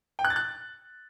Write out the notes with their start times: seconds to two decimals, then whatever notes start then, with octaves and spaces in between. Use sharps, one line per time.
0.19 G5
0.25 F#6
0.30 A6
0.36 F#6